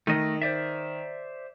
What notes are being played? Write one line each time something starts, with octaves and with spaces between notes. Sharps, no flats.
D#3 A3 D#5
C5 D5 E5